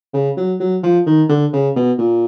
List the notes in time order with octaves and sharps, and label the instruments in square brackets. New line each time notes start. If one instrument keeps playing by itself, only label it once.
[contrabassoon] C#3
F#3
F#3
F3
D#3
D3
C#3
B2
A#2